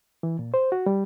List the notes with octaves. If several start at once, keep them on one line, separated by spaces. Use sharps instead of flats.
E3
A#2
C5
F#4
G3